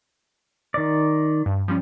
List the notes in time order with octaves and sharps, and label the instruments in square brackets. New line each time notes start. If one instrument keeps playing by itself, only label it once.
[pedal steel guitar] D#3 D5
[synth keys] G2
F3 G3 C#4